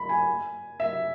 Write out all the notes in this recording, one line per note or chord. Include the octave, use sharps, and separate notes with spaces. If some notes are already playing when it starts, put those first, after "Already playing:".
Already playing: B5
G#5
E5